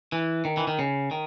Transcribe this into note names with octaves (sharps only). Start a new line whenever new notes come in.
E3
D#3
E3
D#3
C#3
D#3